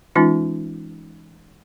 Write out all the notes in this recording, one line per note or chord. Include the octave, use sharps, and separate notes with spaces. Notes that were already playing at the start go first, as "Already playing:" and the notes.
E3 G#3 C#4 D#4 F4